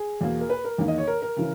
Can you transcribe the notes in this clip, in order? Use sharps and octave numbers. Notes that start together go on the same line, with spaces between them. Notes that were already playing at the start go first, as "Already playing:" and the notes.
Already playing: G#4
E2 B2 A#3
A#4
B4
A#4
E2 D#3 A#3
D#5
C#5
A#4
A#4
C#3 E3